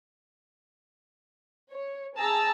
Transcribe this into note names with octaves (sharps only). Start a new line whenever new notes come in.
C#5
G#4 A5 A#5 E6